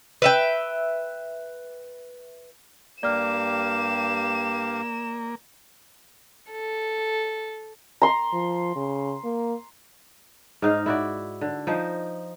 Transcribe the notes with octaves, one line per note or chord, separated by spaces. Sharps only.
B4 E5 G5
G2 A#3 G4 D5 F5 F6 E7
A4
A#5 C6
F3
C#3
A#3
G#2 D#4 F5
E4 F#4 D5
D3
F3 D#4 C5